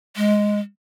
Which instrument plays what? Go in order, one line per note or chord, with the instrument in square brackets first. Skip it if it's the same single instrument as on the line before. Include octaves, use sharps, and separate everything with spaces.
[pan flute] G#3